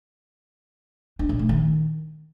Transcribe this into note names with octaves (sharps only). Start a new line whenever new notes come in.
D4
A#2
A3
D#3